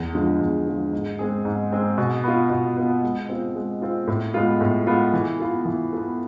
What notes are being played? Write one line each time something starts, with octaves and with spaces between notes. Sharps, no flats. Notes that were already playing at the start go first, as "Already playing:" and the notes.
Already playing: E2
D3 F3 G#3
E2
D3 F3 G#3
G#2
G#3 C4 G#4
G#2
G#3 C4 G#4
B2
B3 F4
B2
B3 F4
G#3
C4 F4
G#3
C4 F4
A2
G#3 B3 F4
A2
G#3 B3 F4
E3
B3 F4 A4
E3
B3 F4 A4